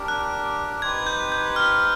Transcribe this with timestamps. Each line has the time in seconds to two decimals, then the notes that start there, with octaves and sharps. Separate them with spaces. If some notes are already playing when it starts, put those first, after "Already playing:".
Already playing: D4 G4 A#4
0.08 F#6
0.82 C4 D#4 G4 B4 G#6
1.07 G6
1.32 G6
1.56 F6